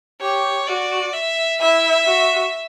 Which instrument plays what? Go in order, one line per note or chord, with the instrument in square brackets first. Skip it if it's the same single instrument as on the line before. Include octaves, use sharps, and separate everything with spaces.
[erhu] G4 [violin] C#5
[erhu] F#4 [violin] D5
[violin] E5
[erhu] E4 [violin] E5
[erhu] F#4